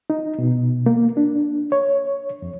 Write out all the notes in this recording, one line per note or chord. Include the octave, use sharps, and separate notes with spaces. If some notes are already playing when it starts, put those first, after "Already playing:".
D#4
B2
A#3
D4
C#5
F2